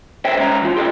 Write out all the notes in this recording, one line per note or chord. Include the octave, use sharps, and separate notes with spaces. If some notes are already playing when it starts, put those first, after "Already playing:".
C5 C#5 D#5 E5 G5
G#2 C#4 A#5
E3 F4
G4 A4 C#5 D#5 G5